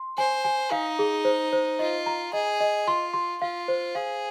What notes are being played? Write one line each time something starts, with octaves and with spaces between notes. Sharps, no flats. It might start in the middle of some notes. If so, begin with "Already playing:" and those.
Already playing: C6
C5 G#5
G#5
D#4 F5
G#4
C5
C5
F4 D#5
A#5
G#4 D#5
D#5
F4 C6
C6
F4 F5
C5
G#4 F5